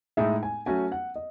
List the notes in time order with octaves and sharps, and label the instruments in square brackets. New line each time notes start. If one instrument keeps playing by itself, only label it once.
[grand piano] A2 G#3 D#4 G#4 [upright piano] E5
[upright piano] G#5
[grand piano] F#3 A3 C#4 F#4 [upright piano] G#5
[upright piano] F#5
D#5